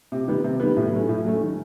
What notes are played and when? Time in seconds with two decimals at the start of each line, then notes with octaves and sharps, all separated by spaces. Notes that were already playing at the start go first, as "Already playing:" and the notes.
0.12 C3
0.28 D#3 G3 B3
0.44 C3
0.60 D#3 G3 B3
0.77 A2
0.92 F#3 A3 C#4
1.09 A2
1.25 F#3 A3 C#4
1.41 D#3